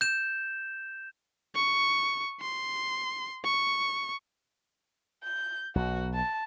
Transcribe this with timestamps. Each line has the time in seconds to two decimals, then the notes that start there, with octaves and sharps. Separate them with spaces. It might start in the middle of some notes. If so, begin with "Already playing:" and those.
0.01 G6 E7
1.55 C#6
2.41 C6
3.44 C#6
5.24 G6
5.75 B1 F#4
6.14 A5